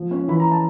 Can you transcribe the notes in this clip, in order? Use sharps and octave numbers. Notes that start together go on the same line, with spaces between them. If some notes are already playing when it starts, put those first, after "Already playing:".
Already playing: F3
C#4
E3 B5
A#5
A5